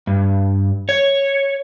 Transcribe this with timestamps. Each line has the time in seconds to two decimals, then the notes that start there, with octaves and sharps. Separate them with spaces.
0.07 G2
0.89 C#5